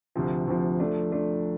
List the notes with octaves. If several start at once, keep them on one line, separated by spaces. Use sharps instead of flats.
D2 C3 F3
D2 C3 F3
F3 A3 D4
F3 A3 D4